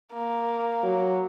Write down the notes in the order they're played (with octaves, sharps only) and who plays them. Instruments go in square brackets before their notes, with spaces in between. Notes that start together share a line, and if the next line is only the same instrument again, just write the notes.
[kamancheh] A#3
[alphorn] F#3